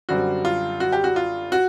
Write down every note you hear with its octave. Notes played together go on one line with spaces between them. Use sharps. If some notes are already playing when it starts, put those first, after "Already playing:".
F#2 D3 G3 C4 F#4
F4
F#4
G4
F#4
F4
F#4